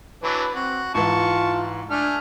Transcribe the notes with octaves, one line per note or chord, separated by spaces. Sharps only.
E3 F#3 D4 B4
C4 F#4
G#2 E3 F4 A5 C#6
A3 D4 G#5 F6